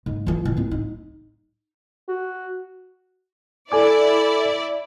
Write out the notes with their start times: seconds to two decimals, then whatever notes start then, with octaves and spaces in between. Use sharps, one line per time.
0.06 G#2
0.27 E3 F4
0.45 A2
0.57 A2 C4
0.71 D#4
2.08 F#4
3.72 E4 A4 D5 G#5 D6